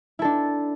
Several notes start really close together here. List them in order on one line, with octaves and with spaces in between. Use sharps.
E4 A4 D4